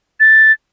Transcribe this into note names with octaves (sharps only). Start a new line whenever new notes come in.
A6